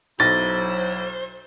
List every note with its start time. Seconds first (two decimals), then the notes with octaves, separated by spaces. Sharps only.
0.20 B1 F#3 E4 C5 A6 A#6